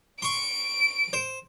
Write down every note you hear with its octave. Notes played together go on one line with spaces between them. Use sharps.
C6 C#6 D7
C5